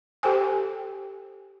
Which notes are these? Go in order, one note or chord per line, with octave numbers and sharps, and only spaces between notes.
G4 A4 C5 G5 G#5